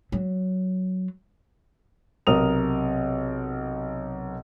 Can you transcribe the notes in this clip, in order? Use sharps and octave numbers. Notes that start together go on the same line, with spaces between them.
F#3
B1 C3 A#4 D#6 F7